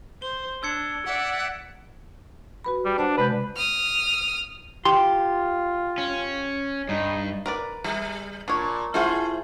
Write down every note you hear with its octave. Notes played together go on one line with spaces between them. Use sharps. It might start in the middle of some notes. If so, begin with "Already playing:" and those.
C5 G7
D4 E6 G#6 C#7
D5 E5 F#5
F#4 B4 B5
G3
D4 C5 D5 F#5
C3 G#3 B4 G6
D#6 F6
F4 G4 C6
C#4
G2 D#4
A#4 B4 D5
G3 B4
A#2 D4 C#5
A3 E4 F4 G#4 C5 F#5